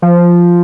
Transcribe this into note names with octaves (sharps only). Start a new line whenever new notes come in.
F3